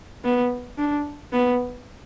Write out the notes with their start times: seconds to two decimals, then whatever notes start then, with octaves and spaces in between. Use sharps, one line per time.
0.24 B3
0.78 D4
1.33 B3